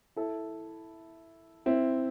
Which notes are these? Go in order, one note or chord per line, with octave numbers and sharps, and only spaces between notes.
E4 A4
C4 E4